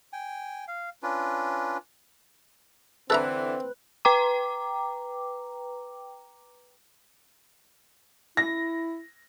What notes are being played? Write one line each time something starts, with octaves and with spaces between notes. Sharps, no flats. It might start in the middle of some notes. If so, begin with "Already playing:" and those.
G5 G#5
F5
C#4 D4 F4 B4
D3 E3 C4 A4 B4 E5 A#5 F#6
B4 G5 A#5 D6
E4 A#6